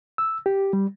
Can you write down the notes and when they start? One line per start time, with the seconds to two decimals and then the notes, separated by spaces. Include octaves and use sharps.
0.18 E6
0.46 G4
0.73 G3